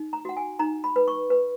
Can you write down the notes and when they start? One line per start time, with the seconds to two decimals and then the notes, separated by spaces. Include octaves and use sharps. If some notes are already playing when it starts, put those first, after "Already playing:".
Already playing: D#4
0.13 A#5
0.25 F#4 F#5
0.37 G#5
0.59 D#4 A#5
0.84 B5
0.96 B4
1.08 C#6
1.30 B4